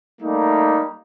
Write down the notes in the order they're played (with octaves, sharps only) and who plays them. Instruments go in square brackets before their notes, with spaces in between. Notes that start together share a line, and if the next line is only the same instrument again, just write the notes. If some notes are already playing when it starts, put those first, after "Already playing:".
[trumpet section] G3 A3 A#3 D#4